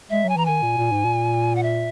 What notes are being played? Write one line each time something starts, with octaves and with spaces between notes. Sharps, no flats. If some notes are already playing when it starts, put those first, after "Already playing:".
G#3 E5
F#3 G#5
E3 A#5
D#3 G#5
A#2
A#2
G#2
A#2
F#5
E5